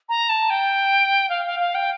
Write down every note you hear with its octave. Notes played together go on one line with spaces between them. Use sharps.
A#5
A5
G5
F5
F5
F5
G5